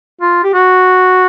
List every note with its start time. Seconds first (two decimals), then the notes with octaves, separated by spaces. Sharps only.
0.21 F4
0.44 G4
0.53 F#4